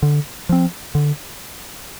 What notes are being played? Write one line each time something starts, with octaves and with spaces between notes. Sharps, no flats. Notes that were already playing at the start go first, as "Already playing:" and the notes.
D3
F3 C4
D3